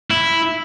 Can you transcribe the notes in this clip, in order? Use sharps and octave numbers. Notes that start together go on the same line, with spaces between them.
E4